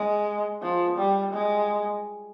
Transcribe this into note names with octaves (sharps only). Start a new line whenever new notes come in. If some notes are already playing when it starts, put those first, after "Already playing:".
Already playing: G#3
F3
G3
G#3